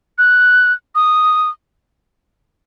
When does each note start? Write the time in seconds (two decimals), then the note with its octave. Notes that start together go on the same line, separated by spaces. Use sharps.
0.18 F#6
0.95 D#6